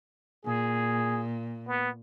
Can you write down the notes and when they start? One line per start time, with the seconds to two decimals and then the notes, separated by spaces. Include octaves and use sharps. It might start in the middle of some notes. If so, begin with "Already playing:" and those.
0.45 A#2 G#4
1.68 B3